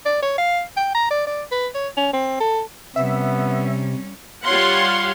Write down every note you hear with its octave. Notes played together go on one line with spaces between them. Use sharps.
D5
C#5
F5
G5
A#5
D5
D5
B4
C#5
C#4
C4
A4
C3 G3 B3 C#4 E5
G3 F4 C#5 F5 F#5 C6